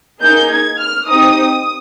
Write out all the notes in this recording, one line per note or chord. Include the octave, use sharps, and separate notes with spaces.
A#3 D#4 G#4 G6
G#6
F6
C4 D#4 G4 D#6